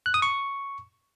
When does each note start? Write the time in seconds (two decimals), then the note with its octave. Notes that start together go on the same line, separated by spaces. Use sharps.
0.06 F#6
0.14 D#6
0.22 C#6